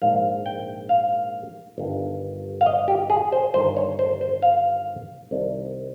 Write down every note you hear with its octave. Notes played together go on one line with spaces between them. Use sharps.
A#1 G#2 D#3 F5
G5
F5
G1 G2 D#3
F5
D#5
G4
G#4
C5
G1 G2 D#3 C5
C#5
C5
C5
F5
C2 C3 D#3